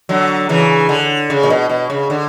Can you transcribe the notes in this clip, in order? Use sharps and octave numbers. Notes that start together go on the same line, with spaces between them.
D3 F#3
C#3 E3
D3
C#3
A#2
B2
B2
C#3
D3